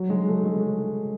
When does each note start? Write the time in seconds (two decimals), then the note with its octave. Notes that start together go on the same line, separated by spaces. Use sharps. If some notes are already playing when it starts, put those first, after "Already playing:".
Already playing: F#3
0.10 G#3
0.28 A3
0.45 G#3